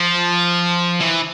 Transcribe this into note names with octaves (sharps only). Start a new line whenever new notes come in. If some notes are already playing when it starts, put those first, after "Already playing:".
Already playing: F3
E3